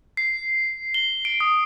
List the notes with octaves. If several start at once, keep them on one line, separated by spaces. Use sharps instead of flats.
C7
G7
D7
D#6